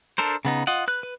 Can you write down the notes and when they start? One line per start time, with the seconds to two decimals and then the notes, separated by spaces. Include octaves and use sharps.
0.18 D4 A4 A#4 C5
0.45 C#3 B3 D#4
0.67 F4 D#5 F#5
0.88 B4 F#6
1.03 B4